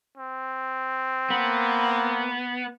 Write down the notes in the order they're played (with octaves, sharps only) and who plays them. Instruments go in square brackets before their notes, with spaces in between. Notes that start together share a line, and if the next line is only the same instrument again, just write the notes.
[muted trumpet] C4
[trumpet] A#3 [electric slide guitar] B3